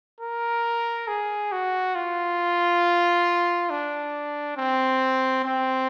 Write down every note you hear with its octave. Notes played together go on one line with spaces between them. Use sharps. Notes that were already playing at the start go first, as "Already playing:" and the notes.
A#4
G#4
F#4
F4
D4
C4
C4